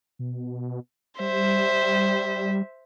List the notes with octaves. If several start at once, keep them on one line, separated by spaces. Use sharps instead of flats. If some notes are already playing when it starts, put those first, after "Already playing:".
B2
G3 C5 E5